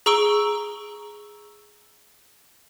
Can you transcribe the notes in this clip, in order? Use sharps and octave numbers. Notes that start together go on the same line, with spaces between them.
G#4 A#5 C#6 E6 D7 G7